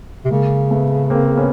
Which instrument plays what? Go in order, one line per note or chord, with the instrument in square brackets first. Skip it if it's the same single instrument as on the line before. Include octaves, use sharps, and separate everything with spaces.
[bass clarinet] C3
[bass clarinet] C#3 [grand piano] G#3 A#3
[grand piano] A3 B3
A#3 C4
B3 C#4